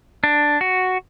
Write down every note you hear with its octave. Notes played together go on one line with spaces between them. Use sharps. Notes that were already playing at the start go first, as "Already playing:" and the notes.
D4
F#4